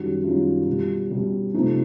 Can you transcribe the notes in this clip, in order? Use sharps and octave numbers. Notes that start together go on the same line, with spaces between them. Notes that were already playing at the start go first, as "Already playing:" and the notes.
Already playing: F#2 D#3 G3 F#4
F#2 D#3 G3 F4
B2 G3
B2 G3
C3 F3 A3 D#4